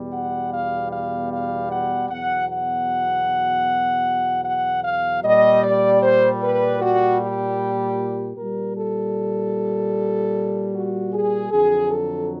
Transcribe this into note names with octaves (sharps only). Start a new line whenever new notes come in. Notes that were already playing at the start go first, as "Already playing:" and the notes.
Already playing: E2 B2 G3
F#5
F5
F5
F5
F#5
E2 B2 F#3 F#5
F#5
F#5
F5
A#2 G3 D#5
D5
C5
B4
F#4
G4
A#2 G3 A#4
A4
F#4
G#4
F2 D3 F#3 G#4
A4